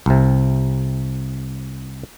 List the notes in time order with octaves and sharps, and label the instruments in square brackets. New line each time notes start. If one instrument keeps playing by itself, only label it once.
[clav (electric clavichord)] C2 C3